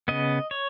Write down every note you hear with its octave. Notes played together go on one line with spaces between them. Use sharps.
C#3 B3 D#5
C#5